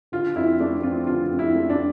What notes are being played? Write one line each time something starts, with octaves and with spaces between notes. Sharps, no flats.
D3 F4
F2 E4
A3 D4
C4 F4
D3 F4
F2
E4
A3
D4